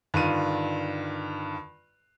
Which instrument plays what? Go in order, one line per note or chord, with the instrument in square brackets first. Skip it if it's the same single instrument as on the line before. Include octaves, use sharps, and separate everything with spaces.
[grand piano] G2 D3 D#3 F4 D#7